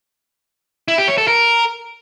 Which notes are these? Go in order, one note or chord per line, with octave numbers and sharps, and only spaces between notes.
E4
G4
C#5
A4
A#4